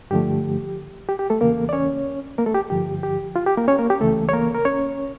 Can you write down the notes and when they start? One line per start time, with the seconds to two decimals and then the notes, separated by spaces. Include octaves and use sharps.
0.11 G2 D3 F3 A3 G4
1.09 G4
1.19 G4
1.30 A3 A4
1.41 E2 C#3 E3 A#3 A#4
1.69 D5
1.73 C#4 C#5
2.38 A#3 A#4
2.46 A3 A4
2.54 G4
2.70 G2 D3 F3 G4
3.03 G4
3.36 F4
3.47 G4
3.57 A#3 A#4
3.68 C#4 C#5
3.79 A#3 A#4
3.90 G4
4.00 C#2 C#3 E3 A3 A4
4.29 C#5
4.33 A#3 A#4
4.55 A#4
4.65 C#4 C#5